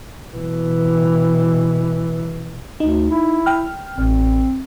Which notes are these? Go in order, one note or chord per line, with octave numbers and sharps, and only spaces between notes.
B2 E3
D2 D#4
E4
G5 F6
A1 C4